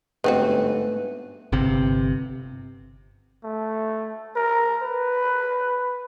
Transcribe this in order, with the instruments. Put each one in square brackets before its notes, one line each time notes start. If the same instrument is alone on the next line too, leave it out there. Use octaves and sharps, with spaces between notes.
[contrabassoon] G1 [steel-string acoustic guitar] G#2 A3 [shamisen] D#3 C4 F#4 [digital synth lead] B4
[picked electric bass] G1 C3
[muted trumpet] A3
A#4
B4